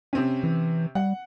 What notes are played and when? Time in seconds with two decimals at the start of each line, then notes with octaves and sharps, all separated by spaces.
0.13 C3 C4 C#4
0.43 E3
0.95 G3 F#5